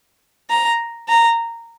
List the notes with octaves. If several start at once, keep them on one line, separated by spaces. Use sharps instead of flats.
A#5
A#5